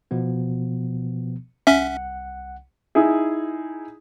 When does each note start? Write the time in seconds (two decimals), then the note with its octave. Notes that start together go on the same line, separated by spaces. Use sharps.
0.11 B2 F3 B3
1.67 C2 C#4 E5 F#5
2.95 D#4 E4 G#4